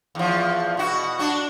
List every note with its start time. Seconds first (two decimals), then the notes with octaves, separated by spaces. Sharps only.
0.15 E2 F3
0.77 B2 F#4
1.19 D4 F#4